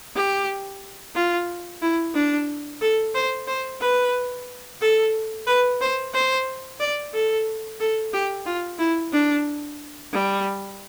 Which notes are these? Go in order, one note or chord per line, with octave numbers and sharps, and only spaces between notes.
G4
F4
E4
D4
A4
C5
C5
B4
A4
B4
C5
C5
D5
A4
A4
G4
F4
E4
D4
G3